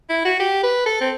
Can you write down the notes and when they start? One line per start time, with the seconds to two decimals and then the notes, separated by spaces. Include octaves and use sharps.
0.10 E4
0.25 F#4
0.40 G4
0.63 B4
0.86 A4
1.01 C4